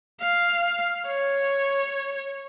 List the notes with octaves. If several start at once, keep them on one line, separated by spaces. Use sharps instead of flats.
F5
C#5